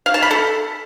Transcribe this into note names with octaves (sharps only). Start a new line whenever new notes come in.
F5
A5
B5
A4